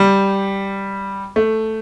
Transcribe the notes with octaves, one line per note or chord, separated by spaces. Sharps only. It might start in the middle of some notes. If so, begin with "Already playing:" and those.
Already playing: G3
A3